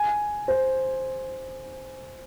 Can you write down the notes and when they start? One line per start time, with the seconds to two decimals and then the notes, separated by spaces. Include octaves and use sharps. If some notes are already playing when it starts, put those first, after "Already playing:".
Already playing: G#5
0.48 C5